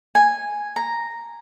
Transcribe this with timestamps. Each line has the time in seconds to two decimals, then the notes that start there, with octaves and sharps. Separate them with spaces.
0.15 G#5
0.76 A#5